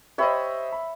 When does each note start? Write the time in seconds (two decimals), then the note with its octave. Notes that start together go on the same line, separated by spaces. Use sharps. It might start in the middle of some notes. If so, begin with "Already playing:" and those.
0.18 G4 C5 C#5 D#5 E5 B5
0.73 B5